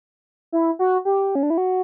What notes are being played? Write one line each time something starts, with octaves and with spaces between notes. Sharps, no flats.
E4
F#4
G4
C#4
D4
E4
F#4